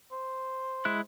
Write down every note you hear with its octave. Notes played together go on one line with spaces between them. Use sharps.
C5
G#3 E4 F#6